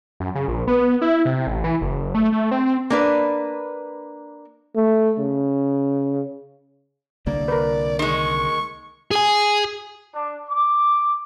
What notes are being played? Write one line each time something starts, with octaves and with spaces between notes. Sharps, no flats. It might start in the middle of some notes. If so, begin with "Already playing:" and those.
F#2
C#3
A#1
B3
E4
C3
A1
E3
F#1
A3
A3
C4
A#3 D4 B4
A3
C#3
C2 D3 A#3 D5
A#4 B4
D#3 G#3 C#6
G#4 G#5
D4
D6